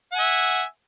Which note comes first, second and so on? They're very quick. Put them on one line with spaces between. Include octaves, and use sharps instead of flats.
F#5 G#5 E5